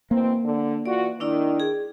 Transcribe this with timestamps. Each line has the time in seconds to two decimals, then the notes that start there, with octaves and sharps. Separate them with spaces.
0.11 B2 E3 A#3 C4
0.44 D3
0.86 E3 F4 F#4 D5
1.20 D#3 D4 E4 D5
1.60 G#4